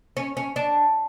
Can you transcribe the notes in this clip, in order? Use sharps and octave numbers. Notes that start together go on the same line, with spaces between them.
C#4
C#4
D4